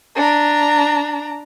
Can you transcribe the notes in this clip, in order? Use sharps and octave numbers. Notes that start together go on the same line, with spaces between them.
D4 A#5